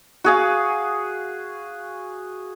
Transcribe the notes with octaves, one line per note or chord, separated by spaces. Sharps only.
F#4 G#4 F5